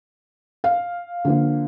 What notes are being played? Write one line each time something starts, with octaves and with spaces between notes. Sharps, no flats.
F5
D3 F3 A#3